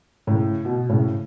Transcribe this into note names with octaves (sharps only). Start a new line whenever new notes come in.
A2 C#3
B2
A2 C#3